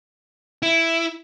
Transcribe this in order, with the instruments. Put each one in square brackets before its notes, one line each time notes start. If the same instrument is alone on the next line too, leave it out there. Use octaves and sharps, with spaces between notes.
[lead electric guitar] E4